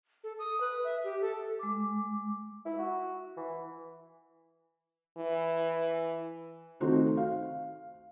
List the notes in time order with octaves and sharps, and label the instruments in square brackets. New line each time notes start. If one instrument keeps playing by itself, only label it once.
[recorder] A4
D#6
B4
E5
G4
A4
[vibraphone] G#3 D6
[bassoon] E4
F#4
E3
[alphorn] E3
[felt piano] D#3 A3 C4 D#4 F#4 C5
F5